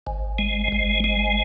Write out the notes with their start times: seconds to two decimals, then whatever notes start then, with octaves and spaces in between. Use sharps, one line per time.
0.07 G#1
0.39 G#3
0.72 G#1
1.04 G#3